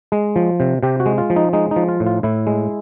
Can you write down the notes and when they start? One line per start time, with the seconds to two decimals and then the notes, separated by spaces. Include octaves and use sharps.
0.12 G#3
0.36 F3
0.60 C3
0.83 C3 G4
1.00 F#4
1.06 G#3
1.18 F4
1.30 F3
1.36 D#4
1.53 G#3 D#4
1.71 D#4
1.76 F3
1.88 F4
2.00 A2
2.06 F4
2.23 A2 E4
2.47 G#3